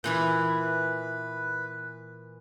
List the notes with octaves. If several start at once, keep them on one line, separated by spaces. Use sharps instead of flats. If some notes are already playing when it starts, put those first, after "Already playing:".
A#2 E3 E4 B4